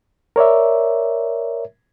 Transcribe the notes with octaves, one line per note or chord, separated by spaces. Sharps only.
A#4 C#5 D5 E5